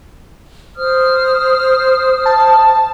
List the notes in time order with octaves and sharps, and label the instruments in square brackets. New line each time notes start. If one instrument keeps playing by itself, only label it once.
[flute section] C5 D#6 F6
[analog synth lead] A5